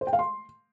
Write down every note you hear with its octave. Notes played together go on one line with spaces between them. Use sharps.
C5
G5
F5
C6